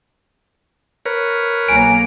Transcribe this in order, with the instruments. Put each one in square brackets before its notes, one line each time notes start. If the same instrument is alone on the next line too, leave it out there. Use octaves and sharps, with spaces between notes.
[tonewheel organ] A#4 B4 C#5
[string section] B1 A#3 A#5 [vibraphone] G#5 [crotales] D7